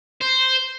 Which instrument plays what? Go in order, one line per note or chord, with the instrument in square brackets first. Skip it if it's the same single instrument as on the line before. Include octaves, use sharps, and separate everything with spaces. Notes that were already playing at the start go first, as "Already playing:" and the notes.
[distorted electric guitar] C5